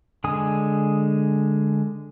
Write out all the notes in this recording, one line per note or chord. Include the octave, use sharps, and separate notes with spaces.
D3 G#3 G#5 D#6